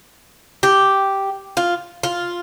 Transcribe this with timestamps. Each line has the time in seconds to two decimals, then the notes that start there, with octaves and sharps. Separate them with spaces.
0.63 G4
1.57 F4
2.03 F4